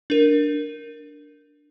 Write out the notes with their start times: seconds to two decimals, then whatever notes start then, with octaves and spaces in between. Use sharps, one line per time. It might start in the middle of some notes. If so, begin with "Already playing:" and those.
0.10 D4 A#4